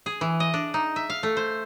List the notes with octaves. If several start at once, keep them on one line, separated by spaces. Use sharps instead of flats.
G#4
E3
D#5
D4
D#4
E5
F5
A3
C5